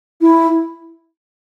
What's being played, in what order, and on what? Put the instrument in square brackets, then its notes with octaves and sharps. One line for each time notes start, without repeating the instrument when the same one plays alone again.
[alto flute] E4